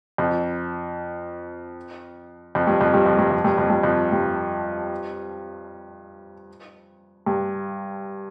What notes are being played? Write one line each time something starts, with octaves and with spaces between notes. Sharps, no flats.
F2
F2
G2
F2
G2
F2
G2
F2
G2
F2
G2
F2
G2
G2